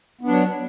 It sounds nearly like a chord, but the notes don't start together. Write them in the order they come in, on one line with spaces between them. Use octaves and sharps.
B3 D4 F#3